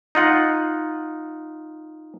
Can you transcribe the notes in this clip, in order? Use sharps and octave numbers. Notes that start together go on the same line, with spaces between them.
D#4 F4 F#5